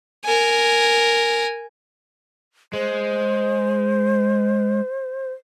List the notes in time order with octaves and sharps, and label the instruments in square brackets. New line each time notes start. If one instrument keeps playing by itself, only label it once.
[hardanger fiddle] A#4 G#5
[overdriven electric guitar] G#3 [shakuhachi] C5